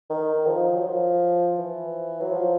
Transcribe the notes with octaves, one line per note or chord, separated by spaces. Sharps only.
D#3
F3
F#3
F3
E3
F#3
F3